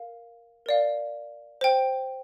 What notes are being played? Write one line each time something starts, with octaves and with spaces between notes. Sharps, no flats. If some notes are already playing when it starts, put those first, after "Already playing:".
Already playing: A#4 F5
A#4 D5 F5
C5 G5